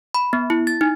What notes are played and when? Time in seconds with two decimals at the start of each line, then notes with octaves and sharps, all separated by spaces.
0.14 B5
0.33 B3
0.50 E4
0.67 A6
0.81 D#4